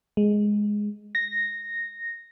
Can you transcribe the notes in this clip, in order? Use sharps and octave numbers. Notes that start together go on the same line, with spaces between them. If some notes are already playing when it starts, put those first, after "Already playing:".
G#3
A#6